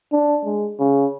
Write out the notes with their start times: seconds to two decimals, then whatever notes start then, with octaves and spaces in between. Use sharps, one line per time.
0.12 D4
0.45 G#3
0.79 C#3